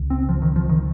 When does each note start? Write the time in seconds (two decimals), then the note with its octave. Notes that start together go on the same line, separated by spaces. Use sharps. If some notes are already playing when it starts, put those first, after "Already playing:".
Already playing: C#2 C#3
0.10 C4
0.29 F3
0.42 D#3
0.56 F3
0.69 D#3